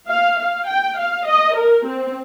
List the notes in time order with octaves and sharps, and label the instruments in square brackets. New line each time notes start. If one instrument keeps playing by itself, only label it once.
[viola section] F5
F5
G5
F5
D#5
A#4
C4